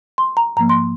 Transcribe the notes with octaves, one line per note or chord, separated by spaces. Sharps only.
C6
A#5
G#2 F3 A#3 A#5
C6